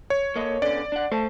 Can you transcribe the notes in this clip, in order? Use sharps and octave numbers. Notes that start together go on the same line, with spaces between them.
C#5
A#3 A4 D#5
D3 B3 C#4 D5
D4 F#5
A3 C5 A5